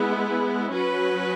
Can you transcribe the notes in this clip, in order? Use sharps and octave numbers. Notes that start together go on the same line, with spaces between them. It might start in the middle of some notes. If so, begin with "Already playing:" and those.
Already playing: G#3 B3 E4
F#3 C#4 F#4 B4